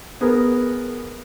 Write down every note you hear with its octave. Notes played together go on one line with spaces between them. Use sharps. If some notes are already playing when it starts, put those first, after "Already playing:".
B3 G#4 A#4